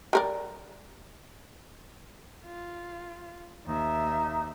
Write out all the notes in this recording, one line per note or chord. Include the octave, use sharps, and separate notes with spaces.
G3 A#4 D5
F4
D#2 D#4 E5